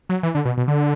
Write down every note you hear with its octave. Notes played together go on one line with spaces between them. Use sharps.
F#3
E3
D3
B2
B2
D3